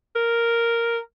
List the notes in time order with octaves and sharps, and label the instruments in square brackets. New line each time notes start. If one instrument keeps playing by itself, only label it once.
[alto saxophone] A#4